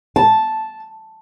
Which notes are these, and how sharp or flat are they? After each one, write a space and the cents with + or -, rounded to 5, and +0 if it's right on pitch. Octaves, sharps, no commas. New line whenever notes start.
A5 -5